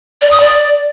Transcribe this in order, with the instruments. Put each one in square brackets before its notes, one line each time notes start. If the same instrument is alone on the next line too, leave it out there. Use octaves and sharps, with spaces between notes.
[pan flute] D5
D#6
D5